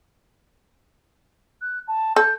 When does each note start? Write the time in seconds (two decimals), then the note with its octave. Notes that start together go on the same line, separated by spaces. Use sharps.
1.62 F#6
1.88 A5
2.16 A4 G6